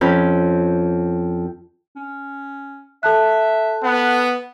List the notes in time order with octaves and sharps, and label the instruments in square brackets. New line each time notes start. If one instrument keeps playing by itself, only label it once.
[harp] F2 C#4 B5 G6
[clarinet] C#4
[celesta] A4 A5 F#6 [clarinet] E5
[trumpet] B3 [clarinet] F#5